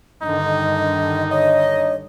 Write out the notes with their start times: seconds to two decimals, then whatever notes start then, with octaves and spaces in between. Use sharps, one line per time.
0.22 G2 D3 D#3 D#4 D#5
1.31 C#5 D#5